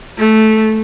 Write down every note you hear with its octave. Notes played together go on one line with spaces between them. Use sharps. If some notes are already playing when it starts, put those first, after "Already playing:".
A3